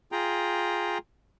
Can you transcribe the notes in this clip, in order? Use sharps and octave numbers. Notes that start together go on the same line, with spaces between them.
F4 G#4 G5 A#5